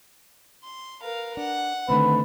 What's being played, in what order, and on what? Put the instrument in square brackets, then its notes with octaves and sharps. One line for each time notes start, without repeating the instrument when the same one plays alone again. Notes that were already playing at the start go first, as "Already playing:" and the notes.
[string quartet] C6
A#4 B4 F5
[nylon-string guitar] D4 [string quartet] F#5
[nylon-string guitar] D3 D#3 C4 [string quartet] A3 [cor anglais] B4